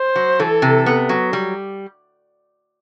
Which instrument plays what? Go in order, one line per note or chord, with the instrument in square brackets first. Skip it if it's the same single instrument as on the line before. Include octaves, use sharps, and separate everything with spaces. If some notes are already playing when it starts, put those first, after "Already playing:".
Already playing: [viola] C5
[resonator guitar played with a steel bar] F#3
[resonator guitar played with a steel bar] E3 [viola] A4
[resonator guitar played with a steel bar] C3
B3
F#3
G3